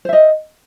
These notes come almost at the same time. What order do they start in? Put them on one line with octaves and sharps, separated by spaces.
C5 E5 D#5